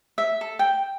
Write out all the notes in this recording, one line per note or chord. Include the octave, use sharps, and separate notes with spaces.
E5
A4
G5